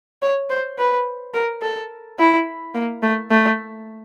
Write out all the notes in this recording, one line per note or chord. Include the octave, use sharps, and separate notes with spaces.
C#5
C5
B4
A#4
A4
E4
A#3
A3
A3